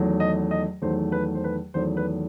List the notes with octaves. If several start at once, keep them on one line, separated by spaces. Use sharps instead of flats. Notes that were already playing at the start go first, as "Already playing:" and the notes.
Already playing: E2 D#3 F#3 A3
D#5
D#5
E2 D#3 F#3 A3 C5
B4
C5
B4
E2 D#3 F#3 A3 C5
B4